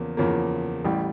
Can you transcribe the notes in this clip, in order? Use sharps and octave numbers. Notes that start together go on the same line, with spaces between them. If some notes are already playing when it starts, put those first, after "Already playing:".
Already playing: E2 C#3 F3 A#3
E2 C#3 F3 A#3
A1 A2 G3